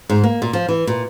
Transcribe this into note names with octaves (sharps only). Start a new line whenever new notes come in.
G#2
A#3
A#2
F3
E3
A#2